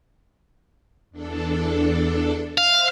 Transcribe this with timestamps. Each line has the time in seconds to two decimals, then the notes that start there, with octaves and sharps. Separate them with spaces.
1.11 E2 D4 A4
2.58 C5 E5 F5 F6